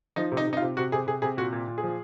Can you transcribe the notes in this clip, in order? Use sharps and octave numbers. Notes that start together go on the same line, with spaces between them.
F3 D#4
C3
D#4
C3
D#4
F4
C3
C3 F#4
C3 G#4
C3 G#4
C3 G#4
A#2 F#4
A#2
A#2
G#4
F3